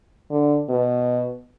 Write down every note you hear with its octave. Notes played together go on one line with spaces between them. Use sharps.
D3
B2